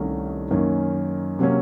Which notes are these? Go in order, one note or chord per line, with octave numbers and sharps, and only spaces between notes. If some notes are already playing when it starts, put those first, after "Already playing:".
Already playing: C2 C3 D#3 A3 C#4
F#2 D#3 A#3 C#4
C3 F#3 A#3 C#4